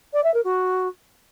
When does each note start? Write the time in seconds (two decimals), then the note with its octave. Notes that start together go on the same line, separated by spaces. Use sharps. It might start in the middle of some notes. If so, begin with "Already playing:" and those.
0.13 D5
0.24 E5
0.34 A#4
0.44 F#4